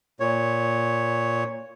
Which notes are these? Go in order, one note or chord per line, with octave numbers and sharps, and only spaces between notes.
A#2 C#5